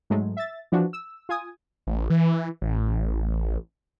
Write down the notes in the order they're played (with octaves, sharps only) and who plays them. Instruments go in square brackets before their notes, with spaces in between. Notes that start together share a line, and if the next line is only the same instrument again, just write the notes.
[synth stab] G#2 F#3 G#3 A3
E5 A6
E3 F3 D4 F#4
E6
F4 G#5 D#6
[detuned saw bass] A1
E3
A1